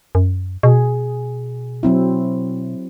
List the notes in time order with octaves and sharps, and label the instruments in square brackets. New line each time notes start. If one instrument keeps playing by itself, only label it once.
[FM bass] F#2
[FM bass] B2 [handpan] G#4
[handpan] F#3 C4 E4